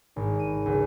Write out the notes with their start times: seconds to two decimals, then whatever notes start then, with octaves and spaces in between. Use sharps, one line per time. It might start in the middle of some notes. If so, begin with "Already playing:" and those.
0.16 G#1
0.39 D#7
0.66 C#2